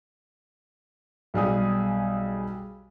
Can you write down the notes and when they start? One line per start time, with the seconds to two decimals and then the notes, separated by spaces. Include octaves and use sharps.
1.34 B1 G3 G#4 D#6